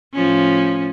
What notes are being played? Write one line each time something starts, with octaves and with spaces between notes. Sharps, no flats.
A2 F3 C#4